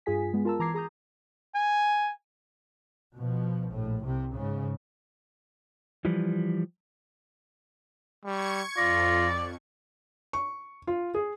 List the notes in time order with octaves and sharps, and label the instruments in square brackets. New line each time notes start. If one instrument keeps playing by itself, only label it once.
[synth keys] G2 F4 G#4 G#5 B6
G#3 B3
F4 A#4 A5 A#5 E6
E3 A#5 D6 G#6 C7
G#4 A#5 D#6 G6
[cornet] G#5
[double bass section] B2 F3
A#1 A2
C2 C3
G#2 C#3
[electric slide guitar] E3 F3 G3
[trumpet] G3 [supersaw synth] C#6 G#6 C#7
[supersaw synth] F2 [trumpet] F4 [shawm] D5 [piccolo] A#6
[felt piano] C#6
F4
G#4